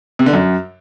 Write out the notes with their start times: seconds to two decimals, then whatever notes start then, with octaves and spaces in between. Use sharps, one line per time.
0.19 C3
0.26 D3
0.33 F#2